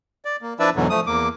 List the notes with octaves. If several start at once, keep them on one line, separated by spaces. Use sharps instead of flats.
D5
A#3
F3 D4 E4 B4 D5 E5
E2 G#2 B2 D3 E3 F#3
F3 A3 D#6
E2 A#3 D6